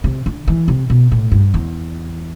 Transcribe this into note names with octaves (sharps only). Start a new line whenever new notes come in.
C3
D3
E3
C3
B2
A2
G2
E2